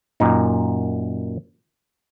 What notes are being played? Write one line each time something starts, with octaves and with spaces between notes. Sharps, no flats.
F#2 A#2 D#4